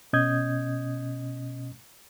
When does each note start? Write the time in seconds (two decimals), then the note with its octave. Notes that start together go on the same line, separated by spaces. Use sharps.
0.13 B2 C#4 D#5 D#6 G6 G#6